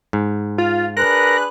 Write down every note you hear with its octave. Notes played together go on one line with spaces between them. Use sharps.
G#2
F4
D4 G#4 A#4 B4 F#6